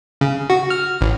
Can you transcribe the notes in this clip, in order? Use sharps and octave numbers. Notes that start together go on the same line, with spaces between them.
C#3
F#4
F6
A1